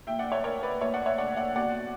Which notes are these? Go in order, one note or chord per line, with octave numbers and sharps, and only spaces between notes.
A#2 E5 G5
D5 F#5
C#5 E5
A#4 C#5
B4 D5
A#2 C#5 E5
D5 F#5
C#5 E5
D5 F#5
D5 F#5
B2 D5 F#5